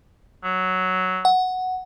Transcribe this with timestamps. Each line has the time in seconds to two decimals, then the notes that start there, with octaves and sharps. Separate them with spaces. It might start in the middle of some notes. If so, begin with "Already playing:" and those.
0.43 F#3
1.25 F#5